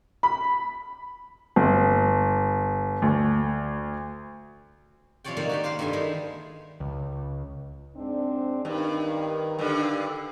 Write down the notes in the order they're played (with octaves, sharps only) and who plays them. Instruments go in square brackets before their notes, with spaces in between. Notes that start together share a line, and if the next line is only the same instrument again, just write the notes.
[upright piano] B5
[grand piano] G1
D2
[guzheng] C3 F3 C#4 C#5 D5 G5
D#3 A#3 C#5 D5
F#4 G4 G5
C5 F5 F#5 C6
G2 G3 A4 G5 G#5
D#3 G#3 E4
[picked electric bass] C#2
[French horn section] G#2 C4 D4
[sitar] G2 [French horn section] D#3
[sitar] G2 D3